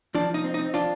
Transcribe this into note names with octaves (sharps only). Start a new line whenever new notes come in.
F3 D4
F3 D#4
C4
C4 D#4
F3 D4 F4